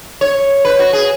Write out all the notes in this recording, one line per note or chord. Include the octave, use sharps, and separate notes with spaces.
C#5
B4
F#4
G#4